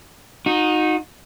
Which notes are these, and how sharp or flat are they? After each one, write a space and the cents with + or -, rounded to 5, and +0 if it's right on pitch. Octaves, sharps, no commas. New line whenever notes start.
D#4 +0 F#4 -30